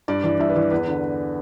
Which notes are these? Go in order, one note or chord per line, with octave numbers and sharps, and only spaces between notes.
G2 D5
E3 D5
G2 E5
B4
E3 D5
E2 B4
D3